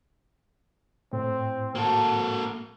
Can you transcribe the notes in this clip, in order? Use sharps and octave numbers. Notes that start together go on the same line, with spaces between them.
A2 C4
A#3 F#4 A4